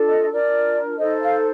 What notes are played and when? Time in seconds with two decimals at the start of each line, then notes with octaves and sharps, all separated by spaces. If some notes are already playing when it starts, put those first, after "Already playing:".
Already playing: D4 F4 A4
0.09 D#5
0.32 D4 F4 A#4 D5
0.98 D#4 A4 C5 D#5
1.20 F5